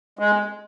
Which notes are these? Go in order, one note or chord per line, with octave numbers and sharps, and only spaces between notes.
G#3